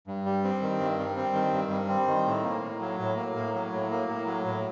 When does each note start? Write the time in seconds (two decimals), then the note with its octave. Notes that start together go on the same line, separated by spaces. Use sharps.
0.07 G2
0.26 G3
0.44 C4
0.62 D#3
0.80 G2
0.99 G3
1.17 C4
1.34 D#3
1.53 G2
1.71 G3
1.89 C4
2.08 D#3
2.26 A2
2.44 A#3
2.62 A2
2.80 F#3
3.00 A2
3.17 A#3
3.35 A2
3.54 F#3
3.72 A2
3.91 A#3
4.08 A2
4.26 F#3
4.45 A2